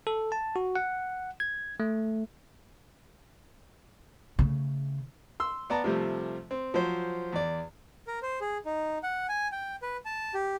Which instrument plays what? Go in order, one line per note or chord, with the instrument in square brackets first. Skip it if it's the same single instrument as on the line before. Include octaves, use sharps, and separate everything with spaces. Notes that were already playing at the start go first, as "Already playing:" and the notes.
[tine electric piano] A4
A5
F#4
F#5
G#6
A3
[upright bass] C#3 A3
[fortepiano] C6 E6
B3 D5 A5 A#5
C3 F3 G3 A3
C4
F3 F#3 C5
E2 D5
[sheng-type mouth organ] A#4
C5
G#4
D#4
F#5
G#5
G5
B4
A5
G4